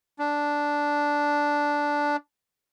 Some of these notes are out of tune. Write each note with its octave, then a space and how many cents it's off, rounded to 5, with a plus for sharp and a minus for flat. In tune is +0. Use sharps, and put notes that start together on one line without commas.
D4 -5